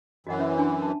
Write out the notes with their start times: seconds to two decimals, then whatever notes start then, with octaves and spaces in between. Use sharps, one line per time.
0.27 F#2 E3 F#4 D#5 F#5
0.39 C#4 C5 E5
0.57 D4 G#5 C6
0.82 A5